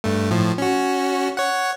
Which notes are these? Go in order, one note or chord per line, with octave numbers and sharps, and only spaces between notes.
G2 A3
A2 F3
C#4 F#4
C#5 F#5